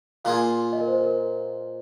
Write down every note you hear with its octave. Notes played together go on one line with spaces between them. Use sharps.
A#2 A#3 F4 G#4 F5
D#5
A#4
C5
A#4